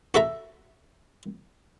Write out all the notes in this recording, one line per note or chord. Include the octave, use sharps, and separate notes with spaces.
F#4 A4 E5 A#5